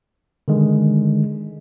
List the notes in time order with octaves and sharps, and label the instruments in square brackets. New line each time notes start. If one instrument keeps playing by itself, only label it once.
[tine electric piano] D3 D#3 G#3